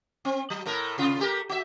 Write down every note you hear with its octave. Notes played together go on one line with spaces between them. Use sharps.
C4
F#3
A2 A3 A#4
C3 F4
A3 G4 A#4
F#4 E5